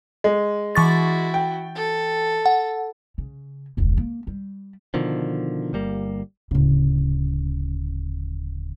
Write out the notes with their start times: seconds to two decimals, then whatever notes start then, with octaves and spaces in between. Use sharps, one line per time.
0.24 G#3
0.75 E3 E4 F#4 C#6 A6
1.34 G5
1.76 A4
2.46 F#5
3.18 C#3
3.77 E1 C#2
3.97 A#3
4.27 G3
4.94 B2 D3 D#3 F3
5.73 G1 G3 A#3
6.51 D1 C#3